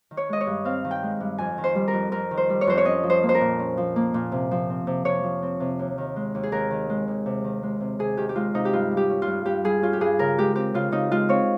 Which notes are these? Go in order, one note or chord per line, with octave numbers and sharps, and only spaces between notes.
D#3
C#5
G#3 D#5
C#5
G2
C4 F5
D#3
G5
G#3
G2
F2 G#5
D#3
C5
G3
A#4
F2
F2 A#4
D#3
C5
G3
C#5
F2 C5
C#5
C#4 D#5
F3
C5
A#3
C5
A#4
A#2
C#4
F3
A#3
A#2
C3
F3
C4
C3
C3 C#5
F3
C4
C3
D#2
D#3
G#3
D#2
G#4
D#2 A#4
D#3
G#3
D#2
C3
D#3
G#3
C3
C3 G#4
D#3 G4
G4
G#3 F4
C3 D#4
G4
G2 F4
G3
G4
C#4
F4
G2
G2 G4
G3 G#4
C#4 F4
G4
G2 G#4
C#3 A#4
G#3 G4
C4 G4
C#3 F4
C#3 D#4
G#3 F4
C4 C#5